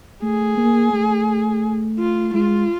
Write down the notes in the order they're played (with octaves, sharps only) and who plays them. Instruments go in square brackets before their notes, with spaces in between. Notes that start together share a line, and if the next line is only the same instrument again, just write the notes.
[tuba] A3 [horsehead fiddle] G#4
[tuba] A#3
A3
[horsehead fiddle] F4
[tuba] G#3 [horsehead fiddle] F4